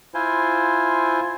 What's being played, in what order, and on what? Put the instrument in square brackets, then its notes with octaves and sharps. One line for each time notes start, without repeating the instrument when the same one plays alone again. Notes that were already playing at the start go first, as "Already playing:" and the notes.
[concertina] E4 F4 C5 G#5